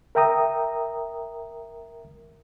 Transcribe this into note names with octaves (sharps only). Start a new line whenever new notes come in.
A#4 E5 G5 A#5 D#6